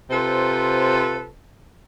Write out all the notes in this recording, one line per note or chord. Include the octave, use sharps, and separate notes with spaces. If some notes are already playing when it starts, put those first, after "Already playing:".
C3 F4 A4 B4 C5